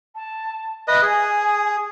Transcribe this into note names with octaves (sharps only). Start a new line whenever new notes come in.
A5
B4 D#5 E5 D#6
G#4 G#5